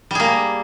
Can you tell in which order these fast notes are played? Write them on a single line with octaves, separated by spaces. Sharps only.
G3 G#4 A#3